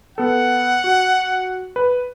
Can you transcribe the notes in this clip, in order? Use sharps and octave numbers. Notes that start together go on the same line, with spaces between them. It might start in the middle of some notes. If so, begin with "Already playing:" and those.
B3 A4 F#5
F#4
B4